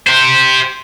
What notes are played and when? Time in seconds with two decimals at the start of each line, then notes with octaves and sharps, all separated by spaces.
0.07 G4 C5